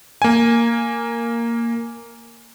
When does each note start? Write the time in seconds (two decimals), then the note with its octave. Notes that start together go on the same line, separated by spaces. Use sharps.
0.22 A#3 G#5